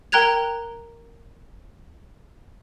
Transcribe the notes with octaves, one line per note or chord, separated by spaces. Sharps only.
A#4 G5 A#5 F#6 G#6 F7